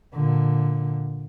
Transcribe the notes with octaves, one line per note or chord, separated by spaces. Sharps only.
A#2 D3